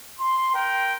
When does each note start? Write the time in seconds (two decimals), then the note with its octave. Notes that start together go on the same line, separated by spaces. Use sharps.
0.19 C6
0.55 A#4 G5